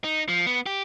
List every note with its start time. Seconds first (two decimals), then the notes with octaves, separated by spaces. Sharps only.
0.04 D#4
0.29 F3
0.46 B3
0.66 G4